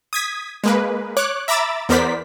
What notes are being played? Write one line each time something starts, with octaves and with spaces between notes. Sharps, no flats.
D#6 G#6 B6
G#3 A#3 B4
C#5 D6 F#6
E5 A#5 B5 D6 E6 A6
E2 B3 A#4 C5 D5 B6